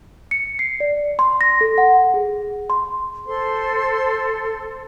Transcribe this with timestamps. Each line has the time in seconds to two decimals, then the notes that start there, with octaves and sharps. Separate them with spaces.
0.31 C#7
0.59 C7
0.80 D5
1.19 C6
1.41 A#6
1.61 A4
1.78 F#5
2.14 G#4
2.70 C6
3.25 A4 C5 C6